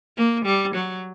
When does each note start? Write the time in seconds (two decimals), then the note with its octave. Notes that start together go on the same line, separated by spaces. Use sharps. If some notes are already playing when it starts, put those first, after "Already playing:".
0.17 A#3
0.45 G3
0.74 F#3